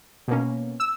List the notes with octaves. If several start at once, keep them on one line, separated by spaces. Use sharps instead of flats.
B2 A#3 C#4
E6